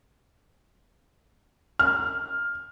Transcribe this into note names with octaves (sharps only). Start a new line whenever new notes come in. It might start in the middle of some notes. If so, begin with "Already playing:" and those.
F6